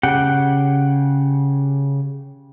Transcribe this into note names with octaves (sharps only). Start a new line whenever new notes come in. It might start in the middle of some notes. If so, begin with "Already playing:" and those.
C#3 G4 F#5 G5